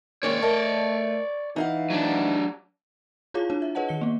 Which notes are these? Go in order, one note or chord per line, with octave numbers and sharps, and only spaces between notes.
D#3 G#3 A#3 C#4 C#5 D5
A3 A#4 D#5 A5
E3 D#4 F5 F#5
F#3 D4
E4 F4 G#4 C#5 F5 D6
D4 E4 F4 C#5
E5
G#4 B4 C#5 D#5 F#5 A5
D#3 C#7 G7
A#3 B3